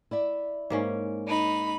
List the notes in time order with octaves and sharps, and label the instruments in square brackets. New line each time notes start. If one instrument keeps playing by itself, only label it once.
[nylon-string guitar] E4 D5 E5
[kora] G#2 A#3 C#4
[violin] D#4 B5